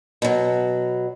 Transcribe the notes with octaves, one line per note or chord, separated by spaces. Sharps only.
B2 F#3